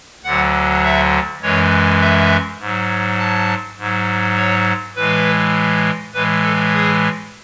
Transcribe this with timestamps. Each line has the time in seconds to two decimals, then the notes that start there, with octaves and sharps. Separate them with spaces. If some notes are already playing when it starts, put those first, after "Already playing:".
0.24 D2 D3 F#3 F#5
0.83 E5
1.42 F#2 E3 G#3 C#5
2.01 E5
2.60 G#2 F#3
3.19 A5
3.78 G#2 F#3
4.37 C#5
4.96 A2 E3 G#3 B4
6.14 A2 E3 G#3 B4
6.44 A4
6.73 G#4